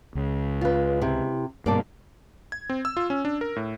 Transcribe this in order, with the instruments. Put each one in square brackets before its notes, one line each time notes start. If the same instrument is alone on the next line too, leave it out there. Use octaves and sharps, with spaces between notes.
[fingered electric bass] C#2
[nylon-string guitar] F4 B4
C3 E4
[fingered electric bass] G2 B2 [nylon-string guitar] A#3 D5 A5
[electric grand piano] G#6
C4
E6
F4
C#4
D4
A#4
A2